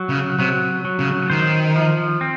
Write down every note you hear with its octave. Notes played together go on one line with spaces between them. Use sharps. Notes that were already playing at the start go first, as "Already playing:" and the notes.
Already playing: F#3
C#3
C3 F#3
F#3
C#3
D#3 C5
F3
C4